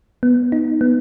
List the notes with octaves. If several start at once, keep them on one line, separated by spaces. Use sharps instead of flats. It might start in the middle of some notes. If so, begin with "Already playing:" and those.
B3
D#4
B3